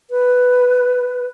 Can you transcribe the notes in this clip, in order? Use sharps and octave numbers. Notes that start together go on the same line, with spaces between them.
B4